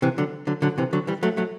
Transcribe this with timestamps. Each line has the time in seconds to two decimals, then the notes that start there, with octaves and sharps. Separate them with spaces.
0.02 C3 E3
0.18 D3 F#3
0.47 D3 F#3
0.62 D3 F#3
0.78 C3 E3
0.93 D3 F#3
1.07 E3 G3
1.23 F#3 A3
1.37 F#3 A3